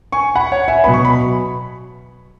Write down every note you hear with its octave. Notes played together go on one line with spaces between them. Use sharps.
G#5 C#6
F#5 B5
C#5 F#5
E5 G#5
B2 F#3 B3 B5
C#6
B5